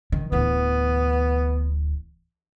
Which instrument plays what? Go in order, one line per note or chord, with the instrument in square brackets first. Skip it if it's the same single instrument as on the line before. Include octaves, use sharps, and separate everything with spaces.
[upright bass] D#3
[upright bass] D1 E3 [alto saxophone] B3